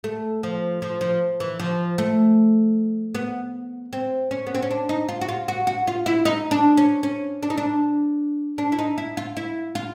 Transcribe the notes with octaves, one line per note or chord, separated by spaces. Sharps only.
A3
F3
F3
F3
E3
F3
A3
B3
C4
C#4
B3
C4
C#4
D4
D#4
F4
F#4
F4
F#4
F#4
F4
E4
D#4
D4
C#4
C#4
D4
D#4
D4
D4
E4
D#4
E4
F4
E4
F4